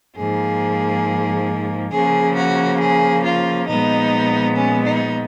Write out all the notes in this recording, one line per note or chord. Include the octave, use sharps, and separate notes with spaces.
G#2 F3 A#3 G#4
C#3 F3 A#3 G#4
F#4
G#4
F4
A#2 F3 G#3 B3 D#4
C#4
D#4